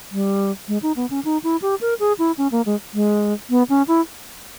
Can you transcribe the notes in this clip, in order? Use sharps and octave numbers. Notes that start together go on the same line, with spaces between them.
G3
G#3
D#4
B3
C#4
D#4
E4
G4
A#4
G#4
E4
C#4
A#3
G#3
G#3
B3
C#4
E4